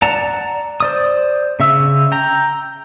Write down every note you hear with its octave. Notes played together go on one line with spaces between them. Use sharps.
D5 F#5 A5 A#5
C5 D5 D#6
C#3 E5 E6
G5 A#5